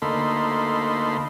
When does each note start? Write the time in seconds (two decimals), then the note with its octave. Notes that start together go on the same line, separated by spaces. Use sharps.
0.02 D2 A#3 D#4 A4 B5 C6